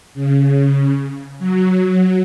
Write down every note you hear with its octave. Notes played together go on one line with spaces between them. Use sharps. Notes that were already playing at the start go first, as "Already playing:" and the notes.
C#3
F#3